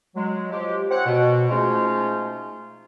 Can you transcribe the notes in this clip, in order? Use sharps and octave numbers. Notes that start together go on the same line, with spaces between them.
F#3 G#3
F3 G#3 G4
C4 C#5 F#5
B2
F3 G#3 A3 C#4 D#4 F4